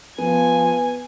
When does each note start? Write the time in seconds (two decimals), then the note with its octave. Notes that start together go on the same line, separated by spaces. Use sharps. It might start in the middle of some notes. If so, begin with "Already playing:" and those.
0.18 F3 B3 G#5